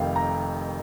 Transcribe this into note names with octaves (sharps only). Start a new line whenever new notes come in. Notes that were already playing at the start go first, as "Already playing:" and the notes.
Already playing: F1 F2 C3 D#3 F5 G5
A#5